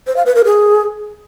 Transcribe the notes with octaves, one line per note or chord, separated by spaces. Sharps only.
C5
F5
B4
A#4
G#4